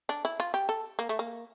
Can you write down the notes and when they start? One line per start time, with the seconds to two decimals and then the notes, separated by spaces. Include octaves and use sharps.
0.09 D4
0.25 E4
0.40 F4
0.54 G4
0.69 A4
0.99 A#3
1.09 A3
1.19 A#3